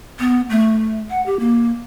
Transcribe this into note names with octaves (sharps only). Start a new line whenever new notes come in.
B3
A3
F#5
G4
A#3